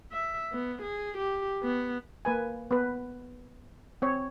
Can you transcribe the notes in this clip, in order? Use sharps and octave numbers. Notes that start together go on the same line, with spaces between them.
E5
B3
G#4
G4
B3
A#3 B4 G#5
B3 B4
C4 C#5